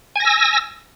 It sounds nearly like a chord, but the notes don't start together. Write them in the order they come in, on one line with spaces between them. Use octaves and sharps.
G#5 A#6 E6